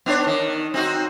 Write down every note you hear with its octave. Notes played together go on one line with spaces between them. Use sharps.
B3 D4 C#5
D#3
C4 D#4 F#4